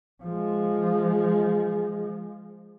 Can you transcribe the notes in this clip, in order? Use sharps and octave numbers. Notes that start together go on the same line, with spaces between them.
F3 G#3